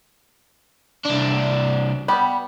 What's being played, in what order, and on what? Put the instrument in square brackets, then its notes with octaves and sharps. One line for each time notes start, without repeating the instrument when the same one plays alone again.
[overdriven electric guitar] C2 D4
[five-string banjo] G3 B3 G4